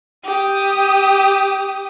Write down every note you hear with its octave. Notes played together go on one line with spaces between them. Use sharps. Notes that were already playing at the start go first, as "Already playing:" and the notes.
G4 D#6